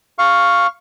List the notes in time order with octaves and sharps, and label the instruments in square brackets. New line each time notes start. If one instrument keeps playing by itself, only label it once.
[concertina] F5 C#6